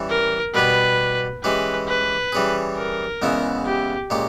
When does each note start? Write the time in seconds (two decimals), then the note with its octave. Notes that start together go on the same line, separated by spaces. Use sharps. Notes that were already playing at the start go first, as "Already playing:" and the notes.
Already playing: E3 G3 C#4 E4
0.10 A#4
0.54 B2 G3 B3 G4 B4
1.44 E3 G#3 C#4 G4 B4
1.88 B4
2.32 E3 G3 C#4 G#4
2.77 A#4
3.22 E2 C#3 G#3 B3 E4
3.66 G4
4.10 A#2 G#3 C#4 G4